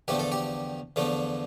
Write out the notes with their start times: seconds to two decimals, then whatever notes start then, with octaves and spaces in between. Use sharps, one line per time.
0.08 E2 D3 F3 A3 G4
0.19 A4
0.32 G4
0.96 E2 D3 F3 A3